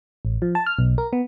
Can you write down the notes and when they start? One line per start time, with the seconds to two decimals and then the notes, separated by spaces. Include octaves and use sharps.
0.25 A1
0.42 F3
0.55 A5
0.66 F6
0.79 B1
0.98 A#4
1.13 B3